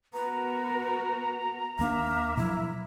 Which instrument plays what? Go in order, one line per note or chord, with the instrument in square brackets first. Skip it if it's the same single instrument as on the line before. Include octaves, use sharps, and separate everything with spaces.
[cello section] B3 F#4 A#4 [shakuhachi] B4 [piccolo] A#5
[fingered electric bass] D#2 B3 D4 [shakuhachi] A#3 [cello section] E5
[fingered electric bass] B2 F3 F#3 [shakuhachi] E4